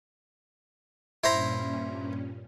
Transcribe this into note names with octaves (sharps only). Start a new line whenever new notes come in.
G2 A#2 C#4 E4 C5 A#5